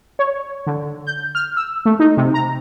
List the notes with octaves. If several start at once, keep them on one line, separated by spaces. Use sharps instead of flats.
C#5
D3
G6
F6
E6
A3
D#4
C3
A#5